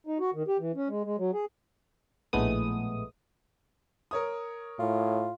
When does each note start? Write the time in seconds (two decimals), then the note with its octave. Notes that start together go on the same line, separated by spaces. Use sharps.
0.07 D#4
0.20 F#4
0.34 D#3
0.48 G4
0.59 E3
0.75 C#4
0.88 G#3
1.04 G#3
1.18 F#3
1.33 G#4
2.33 A#1 A2 G#3 A3 B3 D#6
4.11 A#4 C#5 D#6
4.79 A2 F4